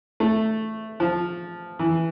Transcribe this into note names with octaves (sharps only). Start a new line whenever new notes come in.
A3
F3
E3